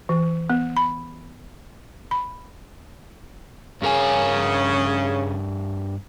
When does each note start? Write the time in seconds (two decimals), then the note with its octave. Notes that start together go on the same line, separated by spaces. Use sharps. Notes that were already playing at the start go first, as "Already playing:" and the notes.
0.09 E3
0.50 B3
0.77 B5
2.11 B5
3.82 G2 C#3 A#4 G#5